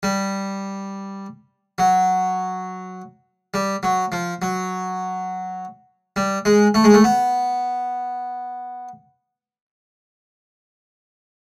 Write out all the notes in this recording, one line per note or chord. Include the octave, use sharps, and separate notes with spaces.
G3
F#3
G3
F#3
F3
F#3
G3
G#3
A3
G#3
A3
B3